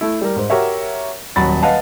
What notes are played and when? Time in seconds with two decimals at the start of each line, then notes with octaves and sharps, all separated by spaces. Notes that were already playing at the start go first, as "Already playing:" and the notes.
0.01 A3 E4
0.21 G3 A#4
0.36 G#2 C5
0.50 F#4 G4 A#4 C#5 E5
1.36 D#1 F#3 B5 A6
1.62 B4 D#5 F5 F#5 A5